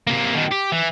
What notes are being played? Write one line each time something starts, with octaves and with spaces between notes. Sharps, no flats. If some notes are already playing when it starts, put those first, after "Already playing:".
C3 A#3
B2 D#3
G4
E3